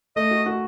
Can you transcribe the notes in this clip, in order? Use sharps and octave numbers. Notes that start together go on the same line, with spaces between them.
A3 D#5
F#4
F#4